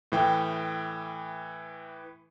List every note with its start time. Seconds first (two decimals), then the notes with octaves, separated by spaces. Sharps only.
0.12 A2 E3 G5